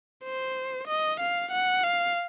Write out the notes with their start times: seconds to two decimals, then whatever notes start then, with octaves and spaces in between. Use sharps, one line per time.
0.24 C5
0.88 D#5
1.20 F5
1.51 F#5
1.83 F5